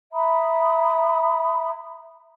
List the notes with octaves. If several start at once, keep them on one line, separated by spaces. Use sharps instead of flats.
E5 A#5 B5 D#6